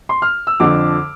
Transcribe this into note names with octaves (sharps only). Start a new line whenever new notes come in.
C6
F6
E6
F2 D3 F3 D6